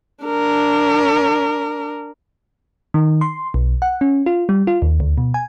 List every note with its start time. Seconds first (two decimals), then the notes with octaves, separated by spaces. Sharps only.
0.24 D4 A#4
2.94 D#3
3.21 C6
3.54 B1
3.82 F#5
4.01 C#4
4.26 F4
4.49 G3
4.67 F4
4.82 D#2
5.00 D2
5.18 B2
5.34 G#5